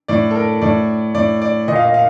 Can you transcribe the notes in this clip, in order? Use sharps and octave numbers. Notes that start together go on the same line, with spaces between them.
A2 D5
A4
A#4
A2 D5
A2 D5
D5
A#2 D#5
F5
D#5
F5